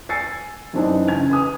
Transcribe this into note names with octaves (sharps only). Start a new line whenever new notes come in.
G#5 E6 A6 C7 C#7
F#2 E3 C4 D4 D#4
C#3 G#5 G#6 F7
B4 G#5 D#6